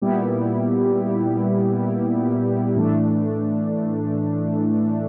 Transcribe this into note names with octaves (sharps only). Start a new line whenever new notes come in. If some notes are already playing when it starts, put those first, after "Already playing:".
A#2 G3 B3 E4 G4
A2 E3 A3 D4